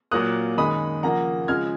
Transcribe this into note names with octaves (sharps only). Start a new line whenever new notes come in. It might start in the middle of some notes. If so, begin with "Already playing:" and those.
A#2 F#3 A#3 D#6 F#6
F#2 D#3 G#3 D#4 B5 D#6
C#3 F3 A#3 F#5 A#5
C#3 F3 G#3 F6 G#6